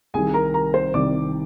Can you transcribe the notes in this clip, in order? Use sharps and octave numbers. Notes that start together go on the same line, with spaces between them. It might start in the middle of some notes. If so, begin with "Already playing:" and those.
C2 C3 D#3 G3 G#4 G#5
A#4 A#5
A#4 A#5
C5 C6
C2 C3 D#3 G3 D5 D6